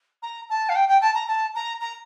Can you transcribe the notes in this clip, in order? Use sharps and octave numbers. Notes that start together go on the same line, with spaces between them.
A#5
A5
F5
G5
G5
A5
A#5
A5
A#5
A#5